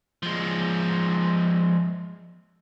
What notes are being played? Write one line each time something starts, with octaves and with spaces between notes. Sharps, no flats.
F3 G#3